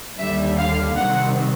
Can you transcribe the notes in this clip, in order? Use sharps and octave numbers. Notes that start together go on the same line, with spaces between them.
D#2 D3 G3 E5
F5
C3 D#3 G3 C4 F#5